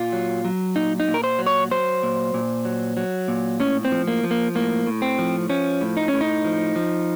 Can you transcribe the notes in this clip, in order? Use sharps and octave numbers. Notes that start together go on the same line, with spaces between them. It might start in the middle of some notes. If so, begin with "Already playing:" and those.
Already playing: A#2 F4
F#3
F#3
A#2 D#4
D#4
A#2
A#4
C5
F#3
C#5
F#3 C5
A#2
A#2
F#3
F#3
A#2
A2 C#4
C4
F3
A#3
F3
A#3
A2 A#3
A2
C4
F3
F3 C#4
A2
D#4
C#4
A2
D#4
F3
F3